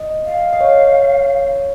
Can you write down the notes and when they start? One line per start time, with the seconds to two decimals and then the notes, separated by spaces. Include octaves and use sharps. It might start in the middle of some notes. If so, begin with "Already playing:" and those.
Already playing: D#5
0.25 F5
0.53 D#5
0.61 C#5